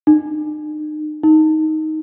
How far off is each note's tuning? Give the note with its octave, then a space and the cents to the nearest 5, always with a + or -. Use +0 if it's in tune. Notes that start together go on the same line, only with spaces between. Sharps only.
D#4 -40
D#4 +10